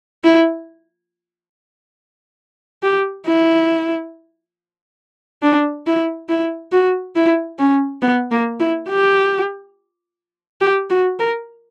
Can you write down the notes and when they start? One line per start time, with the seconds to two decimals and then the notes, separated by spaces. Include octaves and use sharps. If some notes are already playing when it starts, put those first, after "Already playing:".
0.24 E4
2.83 G4
3.27 E4
5.43 D4
5.86 E4
6.29 E4
6.72 F#4
7.16 E4
7.59 C#4
8.02 B3
8.31 A#3
8.60 E4
8.89 G4
10.61 G4
10.90 F#4
11.19 A#4